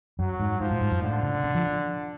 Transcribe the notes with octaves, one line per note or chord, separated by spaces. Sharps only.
F#2 F#3
G#2
G#2 F3
A2
G#2
F#2
A2 D3
C#3
C#3
F3